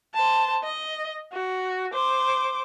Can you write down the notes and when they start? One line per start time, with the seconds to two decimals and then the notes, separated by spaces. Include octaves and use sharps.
0.15 C5 A5
0.64 D#5
1.33 F#4
1.94 C5 D6